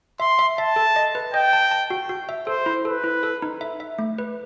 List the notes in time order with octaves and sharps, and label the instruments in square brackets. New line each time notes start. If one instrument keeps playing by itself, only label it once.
[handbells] E5 [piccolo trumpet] C6
[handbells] E5
[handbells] E5 [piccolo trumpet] A5
[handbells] A4
D#5
B4
[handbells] D#5 [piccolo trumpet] G5
[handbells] A5
A5
F#4
F#4
E5
[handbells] A4 [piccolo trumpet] C5
[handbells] E4
[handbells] A4 [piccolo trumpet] B4
[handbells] E4
A4
D#4
E5
E5
A3
B4